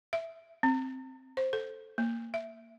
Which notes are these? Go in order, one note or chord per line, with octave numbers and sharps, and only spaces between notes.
E5
C4
C5
A4
A#3
E5